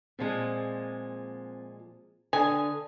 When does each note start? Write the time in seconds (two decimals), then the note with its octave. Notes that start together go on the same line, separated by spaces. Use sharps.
0.19 A#2 F3 G#3 C4 C5
2.33 D3 G#5 D#6